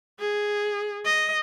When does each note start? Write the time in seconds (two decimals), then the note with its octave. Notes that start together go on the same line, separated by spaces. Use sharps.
0.20 G#4
1.06 D#5